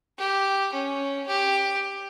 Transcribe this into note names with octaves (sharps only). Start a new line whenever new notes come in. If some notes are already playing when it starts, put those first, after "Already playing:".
G4
C#4
G4